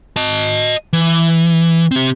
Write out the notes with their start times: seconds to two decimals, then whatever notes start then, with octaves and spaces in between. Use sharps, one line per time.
0.16 D#5 A5
0.93 E3
1.91 C4 G4